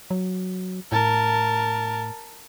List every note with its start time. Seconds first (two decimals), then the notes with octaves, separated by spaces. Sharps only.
0.11 F#3
0.92 A2 A#4 A5